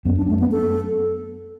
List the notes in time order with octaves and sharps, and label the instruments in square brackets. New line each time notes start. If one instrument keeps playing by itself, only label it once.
[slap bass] F#2 [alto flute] B3
[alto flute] D4
A3
B3
A4